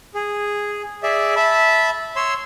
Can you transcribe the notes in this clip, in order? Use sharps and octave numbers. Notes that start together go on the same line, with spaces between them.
G#4
G#4 D5 E5
E5 A5 B5
C#5 C6 E6